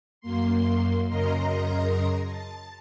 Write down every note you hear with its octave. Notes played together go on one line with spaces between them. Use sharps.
F#2 A#3 C6
F#2 C#3 A#4 D#5 A#5 C6
A5